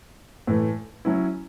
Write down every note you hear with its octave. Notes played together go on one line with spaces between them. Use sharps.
A2 E3 A3
F#3 C#4 E4